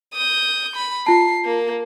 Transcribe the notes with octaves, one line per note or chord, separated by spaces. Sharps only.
D#6 G6
B5
F4 A5 C7
A#3